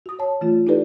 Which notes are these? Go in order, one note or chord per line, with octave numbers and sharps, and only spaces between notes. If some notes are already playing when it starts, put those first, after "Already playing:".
F#4 D#6
C#5 A5
E3 A3 F4
D#4 E4 G4 A4 B4 D5